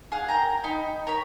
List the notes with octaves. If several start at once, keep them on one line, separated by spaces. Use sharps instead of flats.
G#4 F5 F#5
A#4 G5 A#5
D#4 G5 B5
A#4 C#5 B5